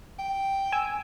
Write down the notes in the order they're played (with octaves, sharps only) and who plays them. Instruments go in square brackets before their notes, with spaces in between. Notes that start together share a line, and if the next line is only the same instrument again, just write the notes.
[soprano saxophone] G5
[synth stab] G#5 E6